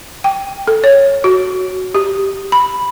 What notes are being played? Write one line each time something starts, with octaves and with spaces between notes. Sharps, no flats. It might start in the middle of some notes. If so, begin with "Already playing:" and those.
G5
A4
C#5
F#4
G4
B5